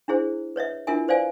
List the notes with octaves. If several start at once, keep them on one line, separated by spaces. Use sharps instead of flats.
D4 E4 G#4 C5
B4 C#5 D#5 E5
D4 E4 F4 A#4 E5 G#5
B4 C5 D5 F5 G#5